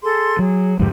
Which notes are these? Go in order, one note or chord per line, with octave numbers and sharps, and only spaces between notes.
G#4 A4 C6
F#3 G#4
C2 F2 G#2 G4